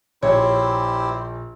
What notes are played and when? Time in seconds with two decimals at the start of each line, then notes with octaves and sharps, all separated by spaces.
0.22 A#1 E4 G4 C5 C#5